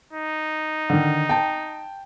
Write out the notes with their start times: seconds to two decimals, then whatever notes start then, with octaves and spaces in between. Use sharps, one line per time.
0.13 D#4
0.90 D3 D#3
1.29 G5 A5